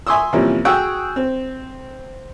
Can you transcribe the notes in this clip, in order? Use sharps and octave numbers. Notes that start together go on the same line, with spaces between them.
E5 G#5 C6 C#6 D#6 E6
C3 E3 F3 G3 A#3 C#4
F#4 G#4 F#5 G5 C#6 E6
C4